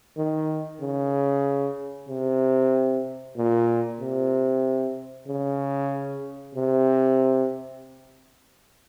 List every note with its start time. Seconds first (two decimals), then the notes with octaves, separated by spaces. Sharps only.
0.17 D#3
0.81 C#3
2.09 C3
3.37 A#2
4.00 C3
5.27 C#3
6.55 C3